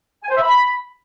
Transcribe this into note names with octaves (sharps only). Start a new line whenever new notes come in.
G#5
C5
E5
B5